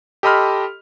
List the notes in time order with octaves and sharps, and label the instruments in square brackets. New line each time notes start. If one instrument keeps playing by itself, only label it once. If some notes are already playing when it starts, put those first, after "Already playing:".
[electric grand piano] G4 A4 D#5 B5 C6 F6